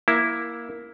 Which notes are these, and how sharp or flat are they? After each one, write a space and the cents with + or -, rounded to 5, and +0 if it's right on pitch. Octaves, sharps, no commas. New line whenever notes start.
A#3 +15 E4 +0